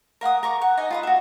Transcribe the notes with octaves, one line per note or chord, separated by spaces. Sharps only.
A#4 F5 F#5 D#6
A#4 C#6 D6
F#5
D#4 D#5 G#5
F4 B4 D#6
F#4 E5